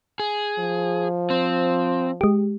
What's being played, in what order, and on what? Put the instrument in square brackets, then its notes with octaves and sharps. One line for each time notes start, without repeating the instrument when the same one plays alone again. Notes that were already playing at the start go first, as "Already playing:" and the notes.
[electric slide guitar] G#4
[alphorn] F3
[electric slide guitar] C4
[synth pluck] G#3 G4